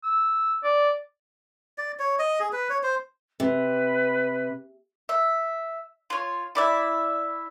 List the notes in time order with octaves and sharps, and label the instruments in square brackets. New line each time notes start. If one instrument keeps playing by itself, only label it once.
[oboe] E6
D5
[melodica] D5
C#5
D#5
G#4
B4
C#5
C5
[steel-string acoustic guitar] C3 [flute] B4
[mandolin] E5
F4 C#5
E4 D5 E5